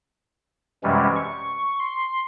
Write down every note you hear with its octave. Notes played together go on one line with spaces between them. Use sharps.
F#2 C3 E3 G3 G#3 C#4
C#6
C6